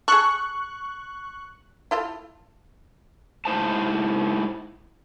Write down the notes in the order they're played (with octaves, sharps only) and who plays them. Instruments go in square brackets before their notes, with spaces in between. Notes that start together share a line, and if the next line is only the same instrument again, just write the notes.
[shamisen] G#4 A4 [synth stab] C#6 F#6
[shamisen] E4 F4 A4
[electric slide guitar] G#2 E4 C5 A5